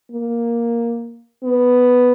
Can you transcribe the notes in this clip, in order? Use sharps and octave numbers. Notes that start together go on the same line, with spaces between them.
A#3
B3